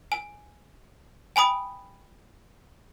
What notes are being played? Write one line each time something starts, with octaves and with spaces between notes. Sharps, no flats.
G#5
G5 G#5 B5 D#6